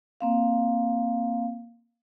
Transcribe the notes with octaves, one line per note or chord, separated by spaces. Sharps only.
A#3 C4 F5